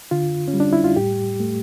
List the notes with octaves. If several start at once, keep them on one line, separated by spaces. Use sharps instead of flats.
D3 F4
C#4
G3
D4
E4
F4
A2 G4
A3